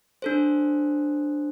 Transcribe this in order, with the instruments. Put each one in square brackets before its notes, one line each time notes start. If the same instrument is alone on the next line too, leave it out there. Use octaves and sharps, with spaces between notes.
[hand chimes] D4 A4 C5